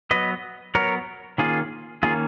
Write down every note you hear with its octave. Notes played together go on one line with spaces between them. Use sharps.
F#3 B3 B4 D#5
F#3 B3 A#4 C#5
D#3 A#3 C#4 F4 G#4
D#3 A#3 C#4 F4 G#4